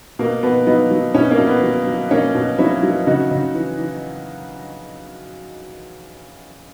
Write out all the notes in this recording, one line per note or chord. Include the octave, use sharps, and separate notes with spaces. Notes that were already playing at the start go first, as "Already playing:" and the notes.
B2 A#3
B2 B3
F#3 B3 D#4
F#3
B2 C#4 E4
A#3 C#4
B2
B3
F#3
F#3
B2 A#3 C#4
B2
F#3 C#4 E4
F#3
C#3 D#4 F#4
C#3
E3
E3